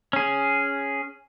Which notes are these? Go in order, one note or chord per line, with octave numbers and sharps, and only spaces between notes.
C#4 G#4